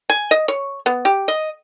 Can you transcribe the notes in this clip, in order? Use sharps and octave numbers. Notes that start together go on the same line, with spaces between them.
G#5
D#5
C#5
B3
G4
D#5